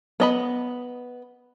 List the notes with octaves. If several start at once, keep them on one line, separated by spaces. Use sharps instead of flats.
B3 D#5 B5